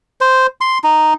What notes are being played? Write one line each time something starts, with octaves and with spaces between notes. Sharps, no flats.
C5
C6
D#4